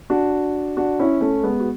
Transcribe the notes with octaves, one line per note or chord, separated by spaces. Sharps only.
D4 F#4
D4 F#4
C#4 E4
A3 C#4
G#3 B3
F#4